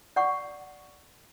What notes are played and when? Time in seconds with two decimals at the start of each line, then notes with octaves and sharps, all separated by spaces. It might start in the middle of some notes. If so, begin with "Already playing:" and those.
0.16 D5 F#5 C#6 D6